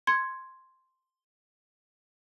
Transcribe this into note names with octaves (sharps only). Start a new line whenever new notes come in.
C6 G#6 C#7